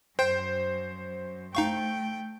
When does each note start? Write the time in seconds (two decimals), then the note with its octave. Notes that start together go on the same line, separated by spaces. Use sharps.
0.19 F#2 C5 G5 G6
1.55 A3 D#4 F5 G5 C#6